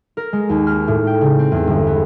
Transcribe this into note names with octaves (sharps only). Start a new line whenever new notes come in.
A#4
G#3
D#2
F6
A2
G5
C#3
C4
E2
G1
B3